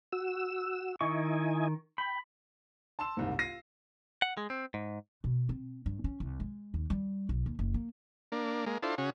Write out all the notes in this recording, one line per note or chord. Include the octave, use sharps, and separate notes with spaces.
F#4 E6
D#3 E4 D#5 G#5 C#6
G5 B5
A5 C6 E6 E7
F#1 C2 G#2
F4 A#6 C7 D#7
F#5
G#3
C4
G#2
B2
C4
G2
C#4
C2
G#3
D#2
G3
B1
D#2
F#1
A#3
A#3 D4
G#3 A#3
D4 E4 F4 A4 C5
C#3 C#4 F#4 G#4